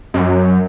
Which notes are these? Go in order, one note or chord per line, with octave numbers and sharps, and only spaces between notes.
F#2